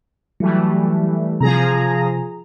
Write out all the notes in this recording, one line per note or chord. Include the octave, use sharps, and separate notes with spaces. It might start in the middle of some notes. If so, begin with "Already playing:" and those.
E3 F#3 G3 A3
C3 F3 G#4 A#5